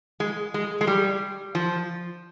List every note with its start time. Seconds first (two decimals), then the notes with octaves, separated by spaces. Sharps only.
0.20 G#3
0.54 G#3
0.81 G#3
0.87 G3
1.55 F3